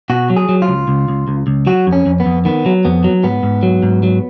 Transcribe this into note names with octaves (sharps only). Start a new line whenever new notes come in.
B2 F#4
F#3
G#4
F#3
F4
C#2
C#2
C#2
C#2
C#2
F#3 F#4
F2
C#4
F2
B3
F2
D#3 B3
F#3
F2 B3
F#3
G#2 B3
G#2
F#3
G#2
F#3